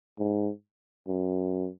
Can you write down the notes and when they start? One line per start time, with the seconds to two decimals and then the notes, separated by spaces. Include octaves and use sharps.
0.19 G#2
1.07 F#2